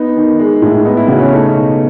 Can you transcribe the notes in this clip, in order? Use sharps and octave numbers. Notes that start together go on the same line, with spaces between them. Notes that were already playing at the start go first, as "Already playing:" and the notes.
Already playing: B3 D#4
D#3
G#3
A2
B3 D#4
E4
C#3 F#4
C#4
A3 D#4
B2